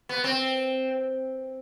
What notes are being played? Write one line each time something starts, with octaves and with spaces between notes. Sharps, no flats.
B3
C4